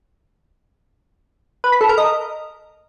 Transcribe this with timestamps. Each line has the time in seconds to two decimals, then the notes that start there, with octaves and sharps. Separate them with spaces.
1.64 B4
1.72 B5
1.81 A4
1.89 A#4
1.98 D#5